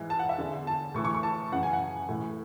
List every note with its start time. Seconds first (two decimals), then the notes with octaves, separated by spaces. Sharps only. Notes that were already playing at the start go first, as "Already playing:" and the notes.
Already playing: G#2 E3
0.10 A5
0.19 F#5
0.29 E5
0.38 E2 D3
0.67 A5
0.94 A2 E3 C#6
1.05 C#6
1.15 C#6
1.23 A5
1.52 F#2 C#3 E3 F#5
1.63 G#5
1.73 F#5
2.09 A2 E3